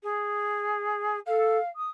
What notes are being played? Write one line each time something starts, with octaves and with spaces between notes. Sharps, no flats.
G#4
A4 F5
D#6